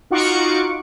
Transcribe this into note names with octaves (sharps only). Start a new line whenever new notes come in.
D#4 F4 F#4 F#5 C#6 D6